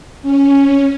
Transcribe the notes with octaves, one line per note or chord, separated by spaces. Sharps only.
C#4